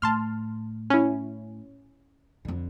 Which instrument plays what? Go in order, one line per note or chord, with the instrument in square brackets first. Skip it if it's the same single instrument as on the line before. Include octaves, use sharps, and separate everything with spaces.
[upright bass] A2 [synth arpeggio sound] A5 C6 F6
[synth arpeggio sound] C#4 E4
[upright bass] F2 D3